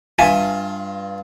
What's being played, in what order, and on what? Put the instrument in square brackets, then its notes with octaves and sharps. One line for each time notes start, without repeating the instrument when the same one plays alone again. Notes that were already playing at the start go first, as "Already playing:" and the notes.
[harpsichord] G2 F4 [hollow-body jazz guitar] E5 G#5 A5